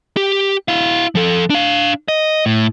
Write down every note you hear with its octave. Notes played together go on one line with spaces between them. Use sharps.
G4
E4 F5
F3 A4
D4 F5
D#5
A2